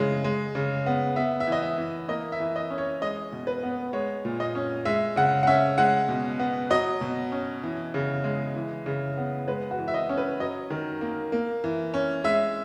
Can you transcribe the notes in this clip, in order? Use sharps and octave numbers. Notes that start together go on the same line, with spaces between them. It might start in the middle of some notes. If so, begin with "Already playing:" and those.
Already playing: C#3 E3 G#3
G#3
C#3
B3
B3 E5
E5
E3 D#5
E5
E3
A#3 D#5
E5
E3
D#5
C#4
C#5
G#3 D#5
B2
B4
B3
G#3 C#5
A#2
D#5
C#4
G#3 E5
C#3 F#5
F#5
C#4 E5
G#3 F#5
B2
B3
F#3 D#5
B2
C#4
E3
C#3
G#3
E3
C#3
B3
G#3 B4
F#4
E3
E5
D#5
C#4
B4
F#3 D#5
D#3
A#3
A#3
E3
C#4
G#3 E5